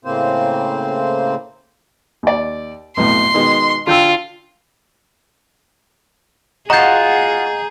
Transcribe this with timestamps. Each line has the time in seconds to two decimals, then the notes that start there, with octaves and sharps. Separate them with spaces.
0.05 A2 C#3 A#3 C4 C5
2.23 D#2 D5
2.97 B1 F2 A2 C6
3.34 B2 D#3 G#3
3.87 D3 F4 G5 E6
6.70 F4 F#4 G#4 D#5 F#5 A#5 G6